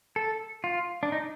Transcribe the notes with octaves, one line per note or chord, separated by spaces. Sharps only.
A4
F4
D4
D#4